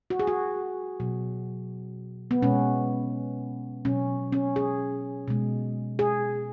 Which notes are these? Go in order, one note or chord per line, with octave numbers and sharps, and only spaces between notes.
F#4
G#4
F#4
B2 F#3
B3
B2 G#3 C#4
B2 F#3 C#4
C#4
G#4
B2 G#3
G#4